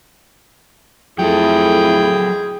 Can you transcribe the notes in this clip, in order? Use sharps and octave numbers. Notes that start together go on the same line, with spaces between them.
F2 F#3 A3 E4 G#4 A4 G5